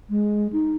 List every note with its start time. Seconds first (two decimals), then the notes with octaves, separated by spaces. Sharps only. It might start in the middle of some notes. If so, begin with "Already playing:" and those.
0.10 G#3
0.53 D#4